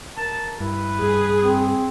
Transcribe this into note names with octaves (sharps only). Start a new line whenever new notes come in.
A#4 A5
G2 E4 B4
G2 G#4
C4